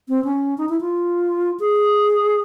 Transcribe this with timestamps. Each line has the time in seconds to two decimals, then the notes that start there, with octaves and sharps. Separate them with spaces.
0.09 C4
0.24 C#4
0.58 D#4
0.69 E4
0.81 F4
1.60 G#4